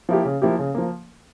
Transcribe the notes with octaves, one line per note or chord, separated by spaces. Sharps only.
F3 A#3 E4 G4
C#3
F3 A#3 E4 G4
C#3
F3 A#3